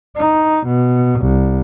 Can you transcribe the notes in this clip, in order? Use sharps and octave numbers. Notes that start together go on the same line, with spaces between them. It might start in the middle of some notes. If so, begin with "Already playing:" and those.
D#4
B2
C2